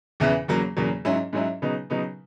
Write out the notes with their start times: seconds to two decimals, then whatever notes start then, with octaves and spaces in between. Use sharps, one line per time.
0.20 E2 C#3 E3 B3 E4
0.48 E2 C#3 F#3 A#3
0.77 E2 C#3 F#3 A#3
1.05 G#2 F#3 C#4 E4
1.33 G#2 F#3 C#4 E4
1.62 C#3 F#3 B3 D#4
1.90 C#3 F#3 B3 D#4